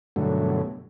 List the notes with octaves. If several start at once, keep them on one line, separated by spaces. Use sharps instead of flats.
G2 B2 D3 F#3 A3